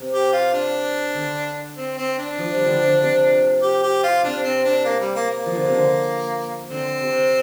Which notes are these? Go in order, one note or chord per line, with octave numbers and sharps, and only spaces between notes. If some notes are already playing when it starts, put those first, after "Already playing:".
Already playing: C3
G4
F4
D4
D3
C4
C4
D4
F3
G3
D3 F3
D3
C3
G4
G4
F4
C3 D4
C4
D4
A#3
G3
A#3
A#3
F3
D3
C3
D3
D3 C4
C3